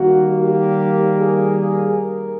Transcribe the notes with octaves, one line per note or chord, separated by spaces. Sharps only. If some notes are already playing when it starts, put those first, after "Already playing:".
Already playing: D#3 G3 A#3 F#4
G4
G#4
A#4